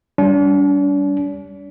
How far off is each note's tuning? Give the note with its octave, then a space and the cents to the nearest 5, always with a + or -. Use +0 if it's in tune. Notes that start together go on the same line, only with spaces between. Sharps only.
G3 +0 D4 -45